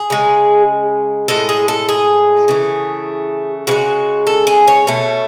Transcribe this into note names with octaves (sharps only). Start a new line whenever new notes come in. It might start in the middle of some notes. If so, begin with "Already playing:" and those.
Already playing: G#4
C#3 G#3
A2 G#3 A4
G#4
A4
G#4
C#3 E3 A3
C#3 E3 G#3 F#4
A4
G#4
C#5
B2 A3